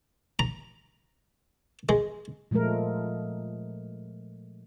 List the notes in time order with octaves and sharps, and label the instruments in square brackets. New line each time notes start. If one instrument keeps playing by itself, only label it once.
[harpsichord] A#5
G#3
[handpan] A#2 F3 G#3 A3 A#4